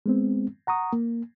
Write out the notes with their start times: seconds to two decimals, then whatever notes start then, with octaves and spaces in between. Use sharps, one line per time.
0.06 G#3 B3 C4
0.67 F#5 A#5 C#6 D#6
0.93 A#3